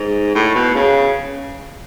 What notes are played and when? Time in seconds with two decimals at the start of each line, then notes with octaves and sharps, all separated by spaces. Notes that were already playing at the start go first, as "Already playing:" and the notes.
Already playing: G#2
0.35 A2
0.55 B2
0.75 C#3